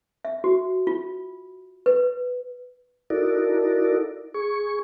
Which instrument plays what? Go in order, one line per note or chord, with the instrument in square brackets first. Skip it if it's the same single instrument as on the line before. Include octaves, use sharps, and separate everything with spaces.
[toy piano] E5
F#4
F4
B4
[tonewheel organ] D#4 E4 F#4 A4 A#4 D5
G#4 C#6